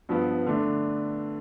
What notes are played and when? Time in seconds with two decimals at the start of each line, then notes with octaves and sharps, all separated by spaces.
0.09 G2 F3 B3
0.47 D3 A3 D4